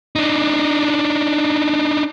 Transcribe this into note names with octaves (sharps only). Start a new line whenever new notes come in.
D4 D#4